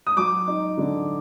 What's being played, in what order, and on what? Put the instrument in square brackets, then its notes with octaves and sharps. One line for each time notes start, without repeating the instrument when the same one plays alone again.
[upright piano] D#6
F#3 D6
D#4
D3